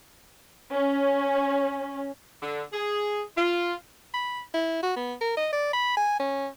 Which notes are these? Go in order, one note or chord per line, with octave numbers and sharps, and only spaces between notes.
C#4
D3
G#4
F4
B5
E4
F#4
B3
A#4
D#5
D5
B5
G#5
C#4